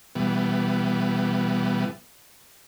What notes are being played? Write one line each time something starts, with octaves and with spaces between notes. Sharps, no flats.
B2 E3 G3 B3